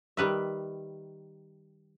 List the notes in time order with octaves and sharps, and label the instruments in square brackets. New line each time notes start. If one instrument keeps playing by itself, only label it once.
[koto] D#3 G3 B4 E5